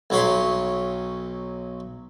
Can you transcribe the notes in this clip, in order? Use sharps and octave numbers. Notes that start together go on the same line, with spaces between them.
B1 F#3 C#5 B5 C6